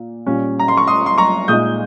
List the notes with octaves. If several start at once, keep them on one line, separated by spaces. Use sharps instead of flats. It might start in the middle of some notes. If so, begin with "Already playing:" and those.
Already playing: A#2
A#2 G3 C#4
A#5
C6
C#6
C6 D#6
C6
A#5 C#6
A#2 G#3 D#4 D#6 G6